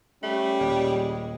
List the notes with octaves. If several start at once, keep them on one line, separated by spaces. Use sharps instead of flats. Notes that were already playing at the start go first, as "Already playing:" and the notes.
G3 A3 C#4
D#1 G#3